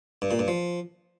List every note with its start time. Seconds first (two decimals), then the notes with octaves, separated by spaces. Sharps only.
0.22 G2
0.31 A#2
0.39 G2
0.48 F3